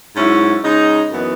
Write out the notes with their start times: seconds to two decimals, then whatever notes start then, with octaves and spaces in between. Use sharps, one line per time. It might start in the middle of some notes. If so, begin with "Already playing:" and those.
0.15 G#2 F#3 C#4 E4
0.63 C#3 G#3 D#4
1.10 F#2 E3 B3 D#4